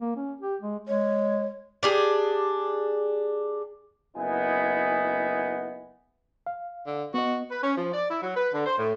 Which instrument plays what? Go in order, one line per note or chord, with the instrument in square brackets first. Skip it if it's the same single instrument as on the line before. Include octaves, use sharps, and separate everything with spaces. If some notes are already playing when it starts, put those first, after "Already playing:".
[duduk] A#3
C#4
G4
G#3
[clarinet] G#3 [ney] C#5
[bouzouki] D4 G4 G#4
[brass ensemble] F#1 B3 D#4 E4 G#5
[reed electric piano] F5
[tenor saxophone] D3
[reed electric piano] B3 D#5 [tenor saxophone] F#4
[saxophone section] B4
C#4
F3
D5
E4
F#3
B4
D3
C5
A2